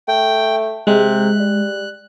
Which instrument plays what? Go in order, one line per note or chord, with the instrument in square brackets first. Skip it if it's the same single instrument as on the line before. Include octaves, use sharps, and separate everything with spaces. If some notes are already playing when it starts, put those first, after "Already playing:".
[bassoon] A3 [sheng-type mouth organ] G5
[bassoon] C3 [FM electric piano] G#3 [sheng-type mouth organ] F#6
[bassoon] G3